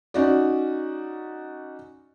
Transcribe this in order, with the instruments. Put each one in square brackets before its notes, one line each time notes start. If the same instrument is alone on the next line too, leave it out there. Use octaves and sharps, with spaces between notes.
[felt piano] C#4 D#4 F#4 D5